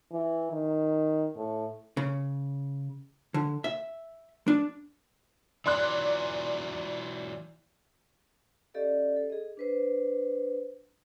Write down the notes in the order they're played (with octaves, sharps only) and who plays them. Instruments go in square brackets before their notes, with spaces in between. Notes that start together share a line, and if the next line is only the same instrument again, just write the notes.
[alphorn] E3
D#3
A2
[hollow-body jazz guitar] C#3
D3
E5
D4
[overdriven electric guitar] E3 F#3 [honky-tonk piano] D5 C6 F#6
[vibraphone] C#4 G4 A4 D5 D#5 F5
A4
G#4 D#5
D4 B4 C5